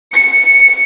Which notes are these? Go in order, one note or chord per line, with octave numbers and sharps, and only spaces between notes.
C#7